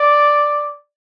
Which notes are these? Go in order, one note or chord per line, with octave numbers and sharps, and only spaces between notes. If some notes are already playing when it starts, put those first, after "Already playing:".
Already playing: D5